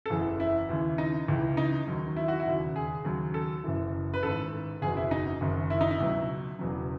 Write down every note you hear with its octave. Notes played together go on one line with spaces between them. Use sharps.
A4
F#1 E2 C#3 E3 G#4
E4
D#2 C#3 E3
D#4
C#2 C#3 E3
D#4
D#2 D#3 F#3
E4
F#4
E4
E1 D#2 C#3
G#4
D#2 C#3 F#3
A4
F#1 F#2 E3
B4
A1 G#2 D#3 A4
F#1 E2 B2 G#4
E4
D#4
F#1 F#2 D#3
E4
D#4
E4
C#2 B2 F#3
E1 E2 C#3 F#3